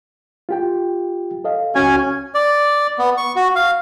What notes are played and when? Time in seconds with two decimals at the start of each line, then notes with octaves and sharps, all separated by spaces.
0.49 F4 G4 G5
1.44 A4 D#5 F5
1.75 C#2 C#4 F#4 G#5
2.34 D5
2.98 B3
3.17 C#6
3.36 F#4
3.56 F5